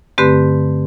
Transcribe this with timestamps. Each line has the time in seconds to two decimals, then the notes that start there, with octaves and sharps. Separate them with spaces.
0.18 G2 D3 A3 C4 G4 B4